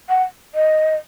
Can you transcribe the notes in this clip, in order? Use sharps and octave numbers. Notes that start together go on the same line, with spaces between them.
F#5
D#5